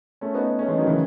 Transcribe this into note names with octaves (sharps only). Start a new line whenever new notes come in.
A3 C#4
B3 D#4
A3 C#4
E3 G#3
D#3 F#3
C#3 E3